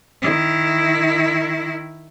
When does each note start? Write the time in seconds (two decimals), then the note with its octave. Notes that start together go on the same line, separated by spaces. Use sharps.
0.21 D#3 E4